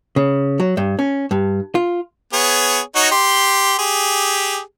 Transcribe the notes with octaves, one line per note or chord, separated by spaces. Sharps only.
C#3
F#3
G2
C#4
G2
F4
B3 G#4 C#5
D#4 F#4 C#5
G4 C6
G4 G#4